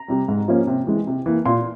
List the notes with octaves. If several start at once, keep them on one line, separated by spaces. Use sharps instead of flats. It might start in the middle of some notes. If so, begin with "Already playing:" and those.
Already playing: A#5
C3 G3
G#2
F3 A#3 C#4
C3
E3 G#3
C3
E3 A#3
A#2 C6